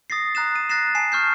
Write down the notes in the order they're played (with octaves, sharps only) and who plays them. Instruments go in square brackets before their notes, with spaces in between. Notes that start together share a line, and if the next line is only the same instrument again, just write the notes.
[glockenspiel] D#6 A6 A#6 C7
A#5 F#6 A6 E7
D#7
F#6 A6 A#6 C7 E7
G#5 A5 C7 E7
C#6 F6 G6 C7